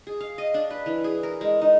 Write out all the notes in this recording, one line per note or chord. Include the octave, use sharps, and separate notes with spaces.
G#4
F5
D#5
D4
B4
E3
G#4
A#4
G#3
D#4